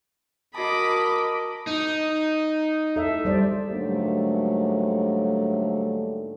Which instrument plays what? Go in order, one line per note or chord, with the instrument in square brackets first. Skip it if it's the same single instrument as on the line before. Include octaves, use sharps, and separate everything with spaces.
[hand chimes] F#4 A5 [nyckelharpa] A#4 D#5 [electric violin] B5 D6
[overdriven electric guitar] D#4
[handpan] A4 E5
G3 C5 D5
[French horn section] G#2 D3 F#3 G3 A3 A#3